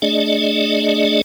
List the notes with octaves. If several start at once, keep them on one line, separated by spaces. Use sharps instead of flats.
A3 D4 G#4 D5 D#5